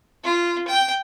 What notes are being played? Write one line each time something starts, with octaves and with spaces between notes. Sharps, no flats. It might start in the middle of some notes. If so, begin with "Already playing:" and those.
F4
G5